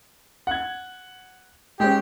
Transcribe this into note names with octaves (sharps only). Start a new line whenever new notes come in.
F#5 G#6
G#3 C#4 G4